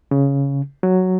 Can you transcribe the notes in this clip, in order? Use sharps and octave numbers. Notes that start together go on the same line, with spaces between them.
C#3
F#3